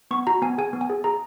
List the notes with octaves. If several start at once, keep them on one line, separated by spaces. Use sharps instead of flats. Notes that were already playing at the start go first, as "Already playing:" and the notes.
B3 C#6
F#4 A#5
B3 G#5
G#4 G#5
B3
G#5
G#4
G#4 A#5